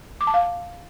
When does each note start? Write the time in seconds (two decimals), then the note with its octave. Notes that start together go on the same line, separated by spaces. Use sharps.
0.21 D6
0.27 A5
0.34 F5